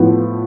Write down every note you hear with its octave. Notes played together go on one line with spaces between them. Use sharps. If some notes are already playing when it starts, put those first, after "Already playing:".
Already playing: A2 F3 B3